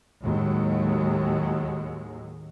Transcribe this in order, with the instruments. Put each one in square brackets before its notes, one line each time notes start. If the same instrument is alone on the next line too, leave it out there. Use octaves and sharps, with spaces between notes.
[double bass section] D#2 A2 F#3 G#3